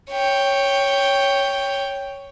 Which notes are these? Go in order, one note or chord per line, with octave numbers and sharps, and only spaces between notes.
C#5 G5